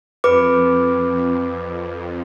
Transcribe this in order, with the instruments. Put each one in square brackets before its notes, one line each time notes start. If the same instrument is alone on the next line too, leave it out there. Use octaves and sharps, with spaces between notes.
[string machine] F2 [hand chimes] B4 D6